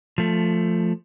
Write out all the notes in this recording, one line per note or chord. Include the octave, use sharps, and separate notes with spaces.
F3 A3